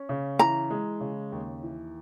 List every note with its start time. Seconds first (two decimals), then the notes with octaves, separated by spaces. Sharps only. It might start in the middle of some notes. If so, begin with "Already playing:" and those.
Already playing: C#4
0.09 C#3
0.39 E3 A#5
0.71 G#3
1.00 C#3
1.32 D#2
1.63 E3